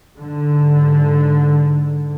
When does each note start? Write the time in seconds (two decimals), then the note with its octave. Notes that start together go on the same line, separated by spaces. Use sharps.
0.19 G#2 D3